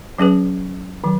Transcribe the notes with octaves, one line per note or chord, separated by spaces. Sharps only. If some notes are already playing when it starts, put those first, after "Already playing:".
F#3 C#4 G#4 B4
D#3 F#3